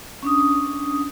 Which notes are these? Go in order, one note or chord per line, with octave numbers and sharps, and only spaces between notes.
C#4 D4 D#6